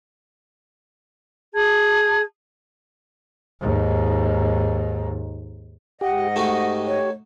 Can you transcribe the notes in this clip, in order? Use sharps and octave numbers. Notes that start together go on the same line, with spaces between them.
G#4 A5 G#6
D#2 G#2
G#2 G4 D#5 F#5
A3 D#4 F#4 G4
C#5